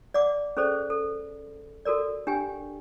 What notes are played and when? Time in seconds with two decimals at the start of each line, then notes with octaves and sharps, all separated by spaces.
0.14 D5 F#5 D6
0.57 C#4 G#4 A4 C5 D5
0.90 A4
1.85 F#4 A4 A#4 D5
2.27 D4 G4 G5 G#5